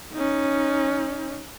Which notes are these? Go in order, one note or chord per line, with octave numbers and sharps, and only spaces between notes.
C#4 D#4